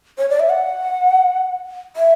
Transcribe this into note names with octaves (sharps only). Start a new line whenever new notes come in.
C#5
D5
E5
F#5
E5